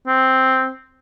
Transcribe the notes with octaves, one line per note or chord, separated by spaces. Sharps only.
C4